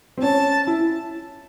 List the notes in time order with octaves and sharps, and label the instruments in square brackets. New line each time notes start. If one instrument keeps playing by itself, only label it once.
[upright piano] C4
[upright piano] C#4 [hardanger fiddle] A5
[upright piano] E4